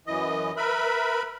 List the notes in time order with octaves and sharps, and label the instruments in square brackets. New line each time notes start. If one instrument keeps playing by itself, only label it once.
[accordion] F#2 E3 D#5
A#4 B4 E5 B5